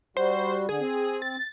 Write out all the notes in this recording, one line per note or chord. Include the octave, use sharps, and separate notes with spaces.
G3 F#4 C5
D3 G#4
C4
A6